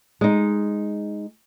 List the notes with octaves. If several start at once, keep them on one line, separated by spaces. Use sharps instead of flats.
G#3 D#4